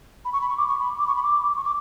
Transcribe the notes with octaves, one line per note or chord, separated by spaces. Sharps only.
B5
C#6
B5
C#6
D6
C#6
B5
D6
C#6
B5
D6
C#6
D6